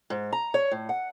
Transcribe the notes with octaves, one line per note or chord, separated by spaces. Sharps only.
G#2
A#5
C#5
A2
F#5